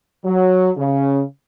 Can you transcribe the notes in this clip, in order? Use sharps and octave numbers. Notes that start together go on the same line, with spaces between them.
F#3
C#3